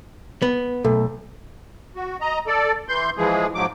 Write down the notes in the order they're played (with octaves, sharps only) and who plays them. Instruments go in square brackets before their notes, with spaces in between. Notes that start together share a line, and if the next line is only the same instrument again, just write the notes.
[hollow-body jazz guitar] B3
[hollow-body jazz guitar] B1 [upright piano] A3
[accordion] F#4
D#5 A#5
A4 D5
E3 C6 G6
E3 F3 G#3 G#4
G#2 F3 F#3 D6